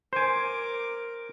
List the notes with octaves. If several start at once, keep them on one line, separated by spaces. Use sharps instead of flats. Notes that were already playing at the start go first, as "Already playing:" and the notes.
A#4 C5 G#5 D6